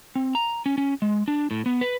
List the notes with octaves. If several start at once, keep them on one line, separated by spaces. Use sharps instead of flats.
C4
A#5
C#4
C#4
G#3
D4
A2
B3
B4